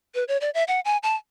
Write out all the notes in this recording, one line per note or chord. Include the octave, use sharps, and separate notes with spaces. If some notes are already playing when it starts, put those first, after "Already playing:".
B4
C#5
D5
E5
F#5
G#5
A5